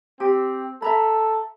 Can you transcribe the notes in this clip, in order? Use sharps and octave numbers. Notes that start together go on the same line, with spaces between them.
C4 G4
A4 E5 A#5 B5